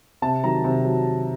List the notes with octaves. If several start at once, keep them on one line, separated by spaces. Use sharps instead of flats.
C3 A5
D#3 F#3 A#5
C3
F#3